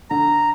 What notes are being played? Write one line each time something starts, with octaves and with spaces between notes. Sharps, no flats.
D3 A#5